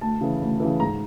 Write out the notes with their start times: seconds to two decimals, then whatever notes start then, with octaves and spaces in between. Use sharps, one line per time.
0.01 D2 A5
0.21 C#3 E3
0.41 D2
0.60 C#3 E3
0.80 G#2 A#5